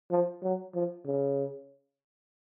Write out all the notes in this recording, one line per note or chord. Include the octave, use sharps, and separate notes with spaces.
F3
F#3
F3
C#3